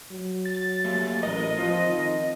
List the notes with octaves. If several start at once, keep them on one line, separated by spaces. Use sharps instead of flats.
F#3
A6
A3 A#3 G4
A1 A#4 B4 D#5
F3 C4 F4
D#3